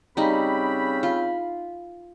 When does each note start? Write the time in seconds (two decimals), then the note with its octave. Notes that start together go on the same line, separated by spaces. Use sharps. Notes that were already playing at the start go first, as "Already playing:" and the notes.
0.17 C#3 G3 C4 D#4 B5
1.03 F4